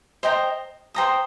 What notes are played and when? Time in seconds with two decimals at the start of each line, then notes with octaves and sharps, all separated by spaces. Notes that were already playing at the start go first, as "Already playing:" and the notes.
0.23 C5 D#5 G5 A#5
0.94 C5 G5 A#5 D#6